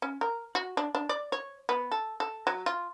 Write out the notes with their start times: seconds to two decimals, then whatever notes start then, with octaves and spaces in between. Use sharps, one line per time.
0.02 C#4
0.21 A#4
0.55 F#4
0.77 D4
0.95 D4
1.09 D5
1.32 C#5
1.69 B3
1.92 A4
2.20 A4
2.47 F#3
2.66 F4